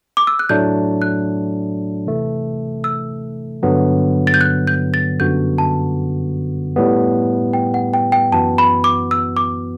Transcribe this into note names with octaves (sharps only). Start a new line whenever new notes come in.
D6
E6
F#6
A2 F#3 A3 D4 G6
F#6
C3 E3 A3
E6
G2 D3 F#3 B3
A6
G6
F#6
G6
A6
F#2 D3 G3 B3 F#4 G6
A5
A2 G3 B3
G5
F#5
G5
G5
F#2 E3 B3 F#4 A5
B5
D6
E6
D6